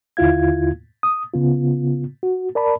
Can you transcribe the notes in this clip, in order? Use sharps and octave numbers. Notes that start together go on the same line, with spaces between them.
D#2 D3 E4 F4 F5 G#6
D#6
C#3 B3 F4
F#4
A#4 D5 A5 B5